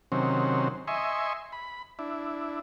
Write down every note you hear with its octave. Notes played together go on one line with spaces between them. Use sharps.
C3 D#3 F#3 C4 C#4
D#5 E5 G#5 C6 C#6
B5
D4 E4